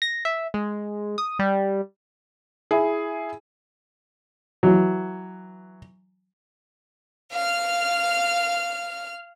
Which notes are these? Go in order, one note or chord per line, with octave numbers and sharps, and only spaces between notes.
A#6
E5
G#3
D#6
G3
E4 G#4
E3 F#3
F5 F6